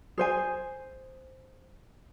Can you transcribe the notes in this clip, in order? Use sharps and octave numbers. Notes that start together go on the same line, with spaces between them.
G#4 C5 G#5